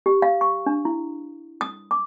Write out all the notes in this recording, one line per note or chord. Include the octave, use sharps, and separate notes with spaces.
G4
F5
C#6
D4
E4
D#6
D6